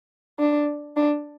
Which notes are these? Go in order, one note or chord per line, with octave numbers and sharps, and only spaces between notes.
D4
D4